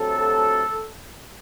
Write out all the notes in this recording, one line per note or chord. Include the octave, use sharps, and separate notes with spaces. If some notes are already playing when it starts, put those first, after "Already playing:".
Already playing: D2 C3 F#3 A4